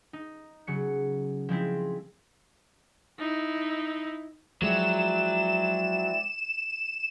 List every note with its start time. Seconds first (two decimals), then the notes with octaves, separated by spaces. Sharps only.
0.13 D#4
0.67 C#3 F#3 C#7
1.49 F3 G#3 C4 E4
3.19 D#4 E4
4.62 F3 F#3 G#3 C4 E4 D5 E7